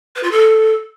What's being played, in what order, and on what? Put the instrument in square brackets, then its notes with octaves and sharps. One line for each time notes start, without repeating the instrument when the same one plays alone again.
[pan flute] B4
F4
A4